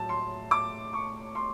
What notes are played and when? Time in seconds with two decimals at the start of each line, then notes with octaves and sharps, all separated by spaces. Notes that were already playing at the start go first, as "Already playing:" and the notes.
Already playing: A2 F#3 A5
0.09 C6
0.51 D6
0.93 C#6
1.35 C6